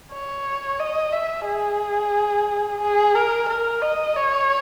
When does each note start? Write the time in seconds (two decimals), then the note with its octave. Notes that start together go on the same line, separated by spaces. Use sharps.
0.13 C#5
0.80 D#5
1.13 E5
1.46 G#4
2.81 G#4
3.15 A#4
3.49 A#4
3.82 D#5
4.16 C#5